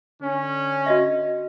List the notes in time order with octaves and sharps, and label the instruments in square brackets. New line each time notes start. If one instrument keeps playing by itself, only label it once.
[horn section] D3 C#4
[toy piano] F#4 D#5 E5